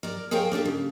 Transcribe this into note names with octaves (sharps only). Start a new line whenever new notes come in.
A#4 D5
G#4 A#4 C5 C#5 F5 G5
A#3 D4 G4 A4
C#3